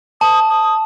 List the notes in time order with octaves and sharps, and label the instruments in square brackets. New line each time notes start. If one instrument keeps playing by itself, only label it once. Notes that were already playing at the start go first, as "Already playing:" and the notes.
[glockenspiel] A5 [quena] D#6
[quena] D#6